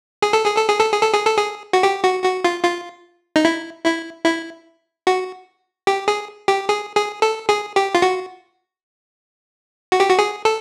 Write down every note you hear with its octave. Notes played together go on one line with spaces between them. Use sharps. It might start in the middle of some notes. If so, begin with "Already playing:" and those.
G#4
A4
G#4
A4
G#4
A4
G#4
A4
G#4
A4
G#4
F#4
G4
F#4
F#4
F4
F4
D#4
E4
E4
E4
F#4
G4
G#4
G4
G#4
G#4
A4
G#4
G4
F4
F#4
F#4
G4
F#4
G#4
A4